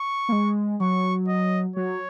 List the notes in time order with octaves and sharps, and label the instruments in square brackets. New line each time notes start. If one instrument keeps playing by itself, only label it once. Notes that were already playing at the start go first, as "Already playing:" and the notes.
Already playing: [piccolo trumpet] C#6
[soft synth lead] A#3
G#3
[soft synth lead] F#3 [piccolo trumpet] C#6
[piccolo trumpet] D#5
[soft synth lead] F#3 [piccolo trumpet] C#5